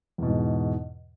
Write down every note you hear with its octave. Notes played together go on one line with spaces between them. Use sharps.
E2 G#2 B2